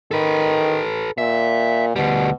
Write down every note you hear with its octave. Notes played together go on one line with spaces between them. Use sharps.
D#3 A4 B4
A#2 E5
D2 B2 G3